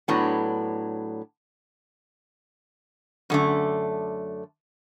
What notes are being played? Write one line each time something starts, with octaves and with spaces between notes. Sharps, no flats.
A2 F#3 B3 D4
F#2 D3 A3